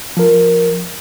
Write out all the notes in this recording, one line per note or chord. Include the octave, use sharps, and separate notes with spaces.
F3 A#4